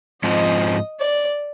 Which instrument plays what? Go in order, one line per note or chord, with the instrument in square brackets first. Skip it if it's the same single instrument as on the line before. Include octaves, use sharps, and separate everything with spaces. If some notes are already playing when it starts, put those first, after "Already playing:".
[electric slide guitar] G#2 F3 C4 [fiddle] D#5
[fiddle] D5